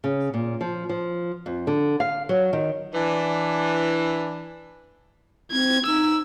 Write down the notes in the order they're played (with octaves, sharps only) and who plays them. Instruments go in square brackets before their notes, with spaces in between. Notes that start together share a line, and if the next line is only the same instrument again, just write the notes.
[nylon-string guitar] C#3
A#2
F3
F3
F2
D3
F5
F#3
D#3
[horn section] E3 D4
[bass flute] C4 [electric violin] G#6
[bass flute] D#4 [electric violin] E6